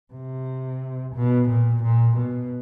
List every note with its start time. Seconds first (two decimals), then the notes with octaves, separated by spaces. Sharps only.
0.13 C3
1.15 B2
1.49 A#2
1.83 A#2
2.17 B2